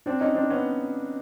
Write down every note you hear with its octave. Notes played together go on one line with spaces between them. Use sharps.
C4 D4
C#4 D#4
C4 D4
B3 C#4